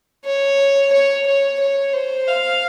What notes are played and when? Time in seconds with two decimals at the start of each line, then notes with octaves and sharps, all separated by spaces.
0.25 C#5
0.92 C#5
1.26 C#5
1.60 C#5
1.93 C5
2.27 F5